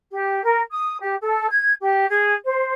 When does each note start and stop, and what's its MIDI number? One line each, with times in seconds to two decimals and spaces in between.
0.12 0.41 67
0.43 0.60 70
0.70 0.95 87
1.01 1.15 67
1.21 1.45 69
1.48 1.71 92
1.80 2.05 67
2.09 2.33 68
2.45 2.73 72